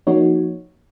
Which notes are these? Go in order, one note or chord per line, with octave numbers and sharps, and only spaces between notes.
F3 A#3 D#4 F#4 C#5